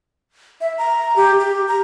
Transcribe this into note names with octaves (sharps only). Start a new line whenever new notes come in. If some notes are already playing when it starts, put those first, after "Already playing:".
E5
A#5
G4
G4
A#5